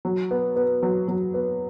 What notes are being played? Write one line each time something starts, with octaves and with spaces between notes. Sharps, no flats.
F#3
B3
B3
F#3
F#3
B3